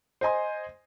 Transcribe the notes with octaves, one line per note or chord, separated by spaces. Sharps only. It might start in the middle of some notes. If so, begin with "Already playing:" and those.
C5 D#5 G#5 C6